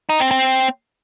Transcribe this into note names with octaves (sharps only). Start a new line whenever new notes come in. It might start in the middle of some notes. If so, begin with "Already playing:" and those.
D#4
C4
C4